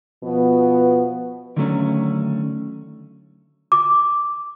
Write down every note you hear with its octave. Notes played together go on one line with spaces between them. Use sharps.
B2 F3 B3
D3 D#3 F#3 A3 C4 C#4
D6